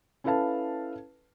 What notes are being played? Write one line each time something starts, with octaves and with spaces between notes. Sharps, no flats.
C#4 E4 A4 B4 F5 A5